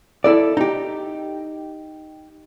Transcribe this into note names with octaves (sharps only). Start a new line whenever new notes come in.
E4 A4 D5
D#4 G4